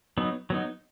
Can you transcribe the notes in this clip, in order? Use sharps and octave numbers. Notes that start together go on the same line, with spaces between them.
F#3 B3 D#4
F#3 B3 D#4